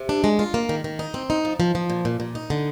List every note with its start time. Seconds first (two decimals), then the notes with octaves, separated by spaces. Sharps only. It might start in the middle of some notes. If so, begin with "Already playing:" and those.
Already playing: C3
0.09 D4
0.24 G#3
0.39 F4
0.54 A#3
0.69 D#3
0.84 D#3
0.99 D#4
1.14 C4
1.30 D#4
1.45 F3
1.60 F3
1.75 F3
1.90 A#2
2.05 A#2
2.20 A#2
2.35 D#4
2.50 D3